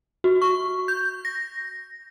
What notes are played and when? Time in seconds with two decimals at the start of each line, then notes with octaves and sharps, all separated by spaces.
0.24 F#4
0.42 C#6
0.88 G6
1.25 A#6